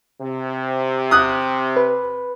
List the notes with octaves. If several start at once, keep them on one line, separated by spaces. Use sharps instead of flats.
C3
D#6 F#6
B4